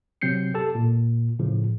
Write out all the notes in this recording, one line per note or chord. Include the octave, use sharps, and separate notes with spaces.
C3 F#3 C4 G6 C7 C#7
G4 A4 A5
A#2
A2 C#3 F3